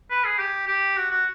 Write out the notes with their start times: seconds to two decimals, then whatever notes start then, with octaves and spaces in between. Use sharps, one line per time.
0.10 B4
0.24 G#4
0.39 G4
0.67 G4
0.97 F#4
1.11 F#4